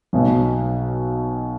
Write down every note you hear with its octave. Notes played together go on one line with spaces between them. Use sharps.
B1 B2 F#3